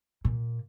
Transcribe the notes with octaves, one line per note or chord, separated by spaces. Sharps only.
A#2